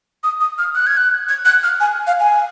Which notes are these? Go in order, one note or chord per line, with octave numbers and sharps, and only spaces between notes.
D#6
D#6
F6
F#6
G#6
F#6
G#6
F#6
F6
G#5
F5
G#5